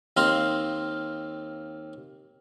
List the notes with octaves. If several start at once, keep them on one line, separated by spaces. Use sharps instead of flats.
D#2 C4 D#4 F5 C6